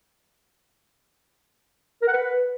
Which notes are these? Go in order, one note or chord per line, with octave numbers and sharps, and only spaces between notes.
A#4
F#5
B4